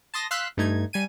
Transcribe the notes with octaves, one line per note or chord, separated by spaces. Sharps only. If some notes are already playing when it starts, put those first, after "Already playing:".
A5 C6 D#6 A#6
F5 C6 E6 F#6 B6
G2 A3 D#4 G#6
G3 G#5 D#7